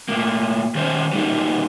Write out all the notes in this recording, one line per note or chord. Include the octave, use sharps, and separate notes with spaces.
A2 A#3
D#3 G3 C#4 C5
F#3 G3 A#3 D#4 F#4 G4